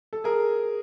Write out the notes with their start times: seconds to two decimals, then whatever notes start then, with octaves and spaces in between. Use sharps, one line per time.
0.13 A4
0.24 G#4 A#4